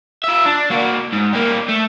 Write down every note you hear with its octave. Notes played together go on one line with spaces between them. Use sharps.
F4 E5
D4
A#3 F#4
G#2
G3 A#3
A3